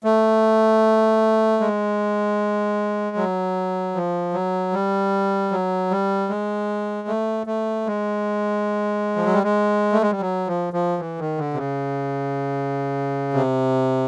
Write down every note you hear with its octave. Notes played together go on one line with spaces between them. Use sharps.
A3
G#3
F#3
F3
F#3
G3
F#3
G3
G#3
A3
A3
G#3
F3
F#3
G3
G#3
A3
G#3
G3
F#3
F3
F3
E3
D#3
D3
C3
C#3
C3